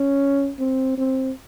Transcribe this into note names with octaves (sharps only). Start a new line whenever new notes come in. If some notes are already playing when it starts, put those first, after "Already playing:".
Already playing: C#4
C4
C4